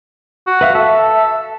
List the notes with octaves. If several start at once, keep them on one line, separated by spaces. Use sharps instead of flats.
F#4
B4 E5 F5
A4 E5